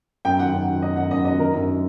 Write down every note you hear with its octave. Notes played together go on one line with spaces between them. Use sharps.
F#2 G5
D#3 F#5
F#2
D#3
D#3 D#5
F#2 F#5
F#2 D#5
D#3 D#5
D3 A#4
F#2